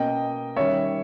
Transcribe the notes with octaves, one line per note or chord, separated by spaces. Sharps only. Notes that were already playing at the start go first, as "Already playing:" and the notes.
Already playing: B2 A#3 C#4 D#5 G5
D#3 G3 C#4 C#5 E5